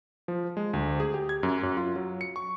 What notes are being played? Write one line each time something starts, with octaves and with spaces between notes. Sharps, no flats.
F3
G#3
D2
G#4
G4
G#6
F#2
F#2
F4
F#3
C#7
C#6